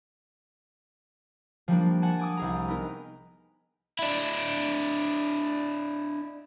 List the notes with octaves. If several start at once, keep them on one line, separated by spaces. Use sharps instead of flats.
F3 G3 A#3 D4
F#5 G#5 A5
G#5 D6 D#6
C2 G#4 A#5
B3 D#4 A#4
D4 E4